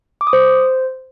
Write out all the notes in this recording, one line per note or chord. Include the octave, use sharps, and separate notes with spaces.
D6
D#6
C5